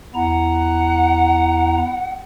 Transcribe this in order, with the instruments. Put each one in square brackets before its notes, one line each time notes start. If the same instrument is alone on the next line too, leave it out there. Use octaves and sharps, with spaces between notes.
[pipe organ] E2 E4 A#5 [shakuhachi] F#5